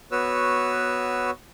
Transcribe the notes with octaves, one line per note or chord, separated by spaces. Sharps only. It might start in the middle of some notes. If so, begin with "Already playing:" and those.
B3 F#4 B4 C#5 E6